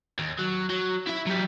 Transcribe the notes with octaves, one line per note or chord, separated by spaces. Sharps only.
D#2
F#3
F#3
E4 E5
F#3 G4